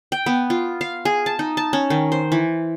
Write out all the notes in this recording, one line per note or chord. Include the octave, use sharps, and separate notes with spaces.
G5
B3
F4
F5
G#4
A5
D#4
A5
C#4
D#3
C5
E3